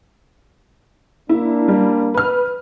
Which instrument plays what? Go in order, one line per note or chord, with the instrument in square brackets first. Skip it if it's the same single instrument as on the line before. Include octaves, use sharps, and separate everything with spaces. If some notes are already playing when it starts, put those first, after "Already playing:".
[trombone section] A#3 D4 [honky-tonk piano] E4
[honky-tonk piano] G3
B4 F6